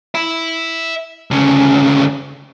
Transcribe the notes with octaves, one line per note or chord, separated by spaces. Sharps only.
E5 B5
D2 C#3